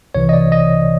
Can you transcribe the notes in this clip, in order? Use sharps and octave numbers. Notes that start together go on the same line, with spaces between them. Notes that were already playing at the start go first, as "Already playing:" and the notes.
C2 C3 E3 C#5
D#5
D5
D#5